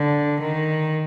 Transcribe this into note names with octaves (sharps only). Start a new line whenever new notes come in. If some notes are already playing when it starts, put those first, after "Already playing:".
Already playing: D3
D#3